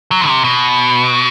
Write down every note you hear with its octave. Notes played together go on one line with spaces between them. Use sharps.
F#3
C3
B2